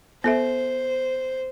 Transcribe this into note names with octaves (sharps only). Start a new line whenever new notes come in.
B3 A4 C5 E5